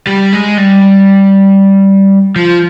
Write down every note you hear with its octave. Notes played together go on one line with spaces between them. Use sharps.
G3
G#3
G3
F3